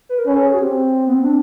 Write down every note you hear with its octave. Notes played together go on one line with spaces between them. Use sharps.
B4
A#4
C#4 B4
A4
G#4
F#4
C4 G4
B3
C4
D4